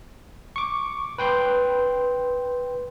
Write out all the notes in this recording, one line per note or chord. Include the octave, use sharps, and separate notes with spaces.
C#6 D6
B4 G5 C6